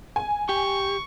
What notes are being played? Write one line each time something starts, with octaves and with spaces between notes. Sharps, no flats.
G#5
G4 C#6